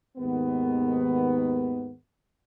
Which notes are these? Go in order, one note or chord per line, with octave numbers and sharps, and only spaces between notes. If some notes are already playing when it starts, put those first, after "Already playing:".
D#2 G#2 D#3 B3